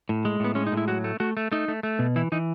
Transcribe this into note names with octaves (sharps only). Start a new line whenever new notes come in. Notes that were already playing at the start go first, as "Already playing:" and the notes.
A2
G#3
A2 B3
G#3 C#4
D#4
A2
E4
F#3 F#4
A3
A3 F#4
A3
A3 D#4
A3
A3
B2
E3 E4
E3 D#4